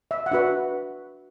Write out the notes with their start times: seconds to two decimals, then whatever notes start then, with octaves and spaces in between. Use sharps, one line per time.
0.11 E5
0.26 F#5
0.31 D4 F#4 B4 E5